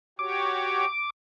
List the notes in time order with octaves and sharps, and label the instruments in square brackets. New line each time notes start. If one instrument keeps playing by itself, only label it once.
[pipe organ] F#4 G4 C#5 [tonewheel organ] D6